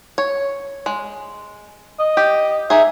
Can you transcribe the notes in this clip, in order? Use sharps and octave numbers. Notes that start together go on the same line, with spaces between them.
C#5
G#3
D#5
G4
D#4 G#4 E5